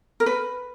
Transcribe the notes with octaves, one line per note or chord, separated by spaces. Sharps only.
A#4
B4